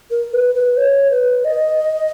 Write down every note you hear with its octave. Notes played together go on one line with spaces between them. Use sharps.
A#4
B4
B4
C#5
B4
D#5